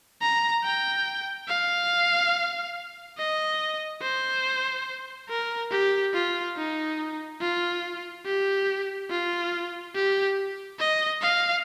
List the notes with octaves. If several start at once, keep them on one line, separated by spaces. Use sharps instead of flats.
A#5
G5
F5
D#5
C5
A#4
G4
F4
D#4
F4
G4
F4
G4
D#5
F5